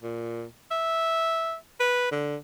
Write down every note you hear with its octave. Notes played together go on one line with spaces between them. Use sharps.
A#2
E5
B4
D3